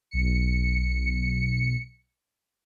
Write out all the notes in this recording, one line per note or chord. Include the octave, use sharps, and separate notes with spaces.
B1 C#7